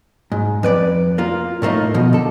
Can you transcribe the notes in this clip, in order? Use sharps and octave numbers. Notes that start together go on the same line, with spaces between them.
G#2
F2 B4 D5
A#3 F4
A2 A3 A#3 D#4
B2 F3
D3 A4